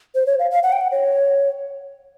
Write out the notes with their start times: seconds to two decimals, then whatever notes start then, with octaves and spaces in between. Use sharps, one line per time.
0.15 C5
0.26 C#5
0.39 F5
0.51 F5
0.63 F#5
0.72 G5
0.81 F#5
0.91 C#5